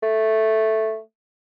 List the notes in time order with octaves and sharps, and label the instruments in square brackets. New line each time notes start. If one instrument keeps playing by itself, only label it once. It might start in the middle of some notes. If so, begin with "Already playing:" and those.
[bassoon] A3